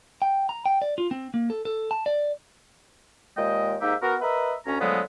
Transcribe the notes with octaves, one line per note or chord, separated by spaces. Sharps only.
G5
A#5
G5
D5
F4
C4
A#3
A4
A4
A5
D5
D#2 A#2 G#3 D#5 G5
G#2 A#3 D#4 G4 E5
B3 F#4 A#4
A#4 B4 D#5 E5
D2 C#4 A#5
D3 F3 F#3 G#3 A3 B3